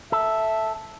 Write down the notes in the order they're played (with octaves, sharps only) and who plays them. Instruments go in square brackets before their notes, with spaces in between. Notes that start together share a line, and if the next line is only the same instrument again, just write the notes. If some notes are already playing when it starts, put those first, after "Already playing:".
[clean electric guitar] A4 [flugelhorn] E5